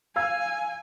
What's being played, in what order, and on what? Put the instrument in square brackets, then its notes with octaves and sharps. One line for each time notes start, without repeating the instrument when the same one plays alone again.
[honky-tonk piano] F5 E6 G#6 [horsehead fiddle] G#5